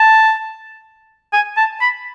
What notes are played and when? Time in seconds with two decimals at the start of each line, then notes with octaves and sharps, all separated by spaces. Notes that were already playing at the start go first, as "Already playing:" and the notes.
Already playing: A5
1.33 G#5
1.57 A5
1.81 B5